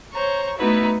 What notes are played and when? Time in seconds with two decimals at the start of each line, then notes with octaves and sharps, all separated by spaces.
0.13 C5 C#5 A#5 C#6
0.58 A3 B3 D#4 E4 F#4 B4